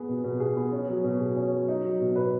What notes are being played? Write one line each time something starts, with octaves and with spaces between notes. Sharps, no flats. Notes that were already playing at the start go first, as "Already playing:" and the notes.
Already playing: B3 G#4
B2
B2
G#4
B3
C#4
F#3
B2
G#4
C#4
F#3
D#4
F#3
B2
B4